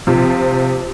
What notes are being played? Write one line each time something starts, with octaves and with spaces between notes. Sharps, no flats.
C3 F3